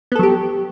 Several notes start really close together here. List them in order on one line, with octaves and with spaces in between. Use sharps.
B3 A4 F#3 G4